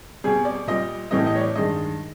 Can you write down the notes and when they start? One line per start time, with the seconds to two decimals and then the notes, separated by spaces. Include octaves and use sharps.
0.24 B2 G3 G#4
0.45 D5
0.67 A#2 G3 D#5
1.11 A2 E3 G3 D#5
1.27 D#5
1.35 C#5
1.41 D5
1.55 G2 D#3 G#3 D#5